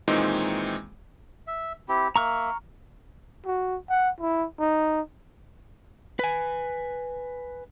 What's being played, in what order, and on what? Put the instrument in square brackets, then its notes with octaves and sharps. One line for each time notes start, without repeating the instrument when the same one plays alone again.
[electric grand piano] A#2 D#3 E3 G#3 C4 D#4
[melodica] E5
C4 E4 G4
[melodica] A#3 E5 [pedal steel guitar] A#5 C#6 F6
[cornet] F#4
F#5
E4
D#4
[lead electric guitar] B4 G#5